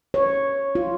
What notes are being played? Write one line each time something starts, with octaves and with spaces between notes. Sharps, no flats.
C#5
F4